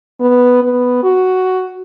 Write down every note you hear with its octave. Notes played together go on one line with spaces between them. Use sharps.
B3
B3
F#4